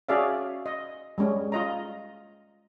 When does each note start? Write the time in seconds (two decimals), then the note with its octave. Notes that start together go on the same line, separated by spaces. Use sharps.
0.09 C#4 F#4 G#4 D5 E5 F5
0.66 D#5
1.18 G3 G#3 C#4
1.52 F4 D#5 A#5